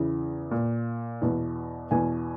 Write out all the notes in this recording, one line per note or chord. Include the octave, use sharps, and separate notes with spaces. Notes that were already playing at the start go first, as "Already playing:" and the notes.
Already playing: E2 C#3 E3
A#2
E2 B2
E2 B2 G#5